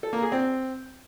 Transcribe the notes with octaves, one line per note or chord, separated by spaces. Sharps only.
A4
A#3
G#4
C4